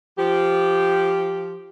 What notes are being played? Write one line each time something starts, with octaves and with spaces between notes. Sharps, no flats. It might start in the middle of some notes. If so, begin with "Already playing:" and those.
F3 G4